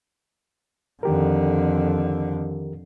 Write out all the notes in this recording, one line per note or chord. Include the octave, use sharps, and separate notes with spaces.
F2 D3 D#3 G4 A#4